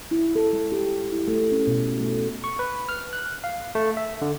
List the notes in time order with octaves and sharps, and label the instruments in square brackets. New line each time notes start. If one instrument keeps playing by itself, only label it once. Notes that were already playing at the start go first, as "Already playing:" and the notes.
[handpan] E4
A4
G#3
G4
E4
A3
C#4
B2
A3
[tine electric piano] C#6
B4
F6
F#6
F5
A3
E5
D3